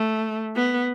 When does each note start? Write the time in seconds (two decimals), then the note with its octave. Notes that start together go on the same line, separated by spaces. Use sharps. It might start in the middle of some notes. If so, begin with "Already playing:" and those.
Already playing: A3
0.56 B3